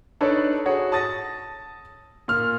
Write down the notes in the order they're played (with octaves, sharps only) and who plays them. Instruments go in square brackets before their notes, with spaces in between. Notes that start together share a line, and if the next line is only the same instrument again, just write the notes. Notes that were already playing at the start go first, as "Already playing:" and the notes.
[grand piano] D4 D#4 A4 B4 C#5 D5
F#4 G#4 C#5
A5 D#6 A6 A#6
A#2 F6